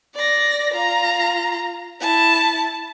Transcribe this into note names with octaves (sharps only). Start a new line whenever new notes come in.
D5 A#6
F4 A#5
E4 A5